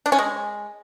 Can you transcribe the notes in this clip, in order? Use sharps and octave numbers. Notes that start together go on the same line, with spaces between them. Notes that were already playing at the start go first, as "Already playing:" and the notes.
D4
C#4
G#3